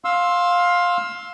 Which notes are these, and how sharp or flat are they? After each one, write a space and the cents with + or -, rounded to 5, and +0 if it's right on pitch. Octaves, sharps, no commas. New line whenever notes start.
F5 +15 C6 +15 E6 +0